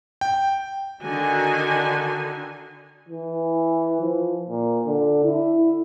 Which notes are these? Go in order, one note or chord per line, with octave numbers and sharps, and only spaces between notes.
G5
D3 D#3 F#4 G#5
E3
F3
A#2
D3
E4